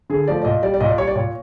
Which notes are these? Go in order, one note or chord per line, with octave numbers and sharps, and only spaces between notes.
D3 G#4
F3 A3 D5
D5
A#2 D#5
G3 D5
D5
A#2 D#5
D5
G3 C#5
D5
A#2 C#5